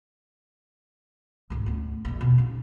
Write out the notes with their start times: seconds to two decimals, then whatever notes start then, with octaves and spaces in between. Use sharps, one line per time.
1.50 C#2 G#2
1.66 D2 B3
2.05 A#1 E2
2.21 B2
2.38 C#3 D#4